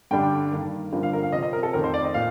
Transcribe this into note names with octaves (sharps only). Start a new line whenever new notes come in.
G2 D3 G3 D4 G5
G2 D#3 A#3
G2 D3 F3 A#3
F5
A#4
F5
C3 F3 C4 D#5
D#5
A#4
A4
F2 D#3 A3 C4 A#4
C5
D5
D#5
A#2 F5